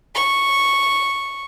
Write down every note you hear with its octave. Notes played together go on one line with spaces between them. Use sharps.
C#6